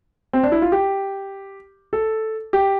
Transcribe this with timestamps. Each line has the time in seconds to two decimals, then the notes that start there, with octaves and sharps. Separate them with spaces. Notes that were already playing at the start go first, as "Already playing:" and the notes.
0.33 C4
0.43 D4
0.52 E4
0.62 F4
0.72 G4
1.93 A4
2.53 G4